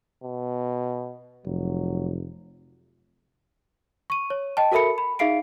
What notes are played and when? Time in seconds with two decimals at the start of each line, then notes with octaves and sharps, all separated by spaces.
0.24 B2
1.46 F1 F#3
4.10 C#6 D#7
4.30 C#5
4.57 D#5 G5 A5
4.72 F#4 A4 A#4 E5 B5 C#7
4.98 B5
5.19 D#4 G#4 E5 F5 C7 D7